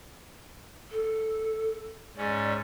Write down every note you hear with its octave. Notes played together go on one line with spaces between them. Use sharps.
A4
G#2 C#4 D5